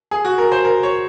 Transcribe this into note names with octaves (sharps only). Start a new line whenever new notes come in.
G#4
F#4
A#4
C5
A#4
C#5